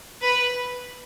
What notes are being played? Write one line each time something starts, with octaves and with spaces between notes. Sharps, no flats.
B4